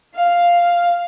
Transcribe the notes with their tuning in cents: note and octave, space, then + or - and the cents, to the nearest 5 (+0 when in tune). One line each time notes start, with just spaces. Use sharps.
F5 +0